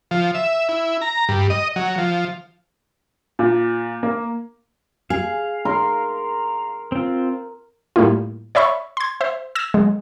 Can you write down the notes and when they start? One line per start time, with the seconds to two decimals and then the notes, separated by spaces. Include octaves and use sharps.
0.11 F3
0.35 E5
0.69 E4
1.02 A#5
1.29 G2
1.50 D#5
1.76 F#3
1.98 F3
3.39 A#2
4.03 A#3
5.10 G#4 F5
5.65 A#4 C6
6.92 C4 F4
7.96 A2 G3 A#3 E4 F4
8.55 C#5 D5 E5 B5 C#6
8.97 C6 G#6
9.21 C5 E5
9.55 E6 G#6 A#6 E7
9.74 F#3 G#3